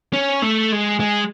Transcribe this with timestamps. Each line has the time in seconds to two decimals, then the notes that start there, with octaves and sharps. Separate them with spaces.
0.13 C#4
0.42 A3
0.72 G#3
1.00 G#3